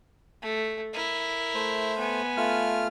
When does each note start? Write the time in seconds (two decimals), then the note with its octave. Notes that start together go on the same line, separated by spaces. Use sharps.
0.42 A3
0.94 E4 A#4
1.55 A3 C5
1.99 B3 G#5
2.37 A3 F4 F6